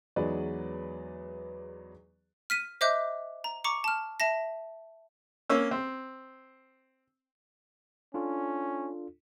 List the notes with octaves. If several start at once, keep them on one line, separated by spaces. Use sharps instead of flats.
E2 F#3 G#3 D#4 B4 D5
F6 B6 D#7
C5 D#5 E5 D6 F#6 G6
A#5
A#5 C#6 D6 C#7
A5 F6
E5 A5 A#6
A#3 C#4 E6
C4
C#4 D4 F4 A4